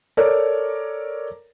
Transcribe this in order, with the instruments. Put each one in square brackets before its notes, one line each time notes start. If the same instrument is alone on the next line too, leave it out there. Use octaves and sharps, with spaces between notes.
[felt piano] A4 A#4 C#5 D5